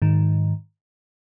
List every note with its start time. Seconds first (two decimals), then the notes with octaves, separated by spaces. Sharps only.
0.02 G#2 D#3